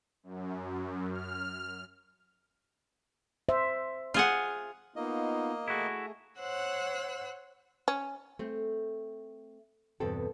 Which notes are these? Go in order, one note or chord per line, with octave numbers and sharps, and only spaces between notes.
F#2
F6
C5 E5
F4 G#4 F#5
A#3 B3 D#4 F4 D#5
A3 E4 F#4 G#4
C5 C#5 F#5 E6 F#6
C#4
A3 C4
E2 G2 B2 C4 A4 G5